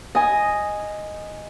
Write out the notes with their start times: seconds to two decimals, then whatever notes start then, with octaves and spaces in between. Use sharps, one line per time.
0.15 D#5 G#5